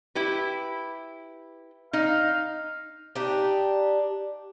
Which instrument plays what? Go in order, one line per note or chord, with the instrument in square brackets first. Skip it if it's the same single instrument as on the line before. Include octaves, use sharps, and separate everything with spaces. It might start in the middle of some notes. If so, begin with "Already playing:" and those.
[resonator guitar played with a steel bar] E4 G4 B4
[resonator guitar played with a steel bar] D#4 [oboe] F5
[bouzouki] D4 D#4 G4